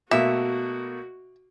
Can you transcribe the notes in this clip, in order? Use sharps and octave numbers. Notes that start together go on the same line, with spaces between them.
B2 A3 A#3 F#4 E5